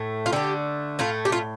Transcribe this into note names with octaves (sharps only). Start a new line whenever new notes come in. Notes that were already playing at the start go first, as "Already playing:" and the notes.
Already playing: A2 A3
F4
D3 A3 G4
A2 A3 F4
G4
F4